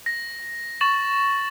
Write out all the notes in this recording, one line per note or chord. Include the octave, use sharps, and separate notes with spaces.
A#6
C#6 A6 E7 F#7